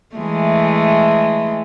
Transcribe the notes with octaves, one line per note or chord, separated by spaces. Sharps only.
E3 G#3 A3